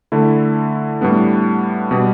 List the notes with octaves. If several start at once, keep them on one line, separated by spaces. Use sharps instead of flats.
D3 A3 E4
A2 G3 B3 D4
B2 G3